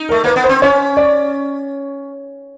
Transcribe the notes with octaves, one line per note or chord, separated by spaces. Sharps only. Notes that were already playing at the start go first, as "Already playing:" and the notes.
Already playing: D#4
A#4
A3
A#3 B4
B3
C5
C4
C#4 C#5
D5